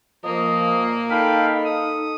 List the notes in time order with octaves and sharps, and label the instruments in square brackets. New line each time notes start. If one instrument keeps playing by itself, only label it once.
[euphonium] F3 [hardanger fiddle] A#3 [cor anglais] D#5
[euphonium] A#2
[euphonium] D#4 [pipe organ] A4 F5 B5 [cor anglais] G5
[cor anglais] A4 [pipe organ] D#6